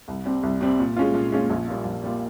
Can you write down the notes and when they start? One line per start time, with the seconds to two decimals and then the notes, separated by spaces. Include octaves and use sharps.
0.08 C2
0.26 C3 G3 C4
0.43 C2
0.61 C3 G3 C4
0.79 A#2
0.96 G#3 C#4 F4
1.14 A#2
1.32 G#3 C#4 F4
1.50 A#1
1.68 A#2 G3 A#3 F4
1.85 A#1
2.03 A#2 G3 A#3 F4